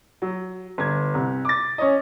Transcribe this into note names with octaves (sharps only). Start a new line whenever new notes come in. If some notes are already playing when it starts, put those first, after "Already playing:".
F#3
G1 G#6
C2
D6 A6
C#4 C#5 D#5